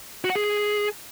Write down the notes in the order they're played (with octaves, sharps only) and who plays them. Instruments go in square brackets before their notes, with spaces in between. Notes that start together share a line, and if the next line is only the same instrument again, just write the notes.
[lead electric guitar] F#4
F#5
G#4